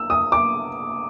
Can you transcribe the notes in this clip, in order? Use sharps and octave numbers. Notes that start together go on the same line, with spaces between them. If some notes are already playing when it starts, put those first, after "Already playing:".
Already playing: E6
D#6
D6